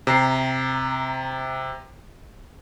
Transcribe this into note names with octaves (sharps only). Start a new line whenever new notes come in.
C3 A#5 C7